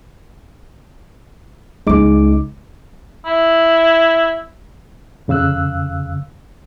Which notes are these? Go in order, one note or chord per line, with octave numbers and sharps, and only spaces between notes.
C#2 G#3 C#4 D#4 D6
E4
F2 C#3 F5 E6 F#6